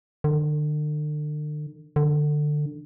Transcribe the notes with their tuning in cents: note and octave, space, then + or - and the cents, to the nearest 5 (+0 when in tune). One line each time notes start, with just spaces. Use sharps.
D3 +40
D3 +20